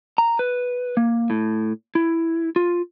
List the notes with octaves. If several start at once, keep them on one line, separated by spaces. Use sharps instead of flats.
A#5
B4
A#3
A2
E4
F4